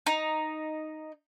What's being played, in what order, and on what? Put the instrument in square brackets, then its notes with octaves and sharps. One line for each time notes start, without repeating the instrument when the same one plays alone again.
[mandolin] D#4